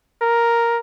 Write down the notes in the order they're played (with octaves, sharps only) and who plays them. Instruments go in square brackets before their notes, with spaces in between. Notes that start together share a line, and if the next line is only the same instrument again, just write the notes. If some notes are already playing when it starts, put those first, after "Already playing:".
[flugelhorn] A#4